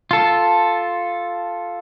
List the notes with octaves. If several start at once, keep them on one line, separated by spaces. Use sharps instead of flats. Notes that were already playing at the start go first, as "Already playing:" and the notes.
F4 A4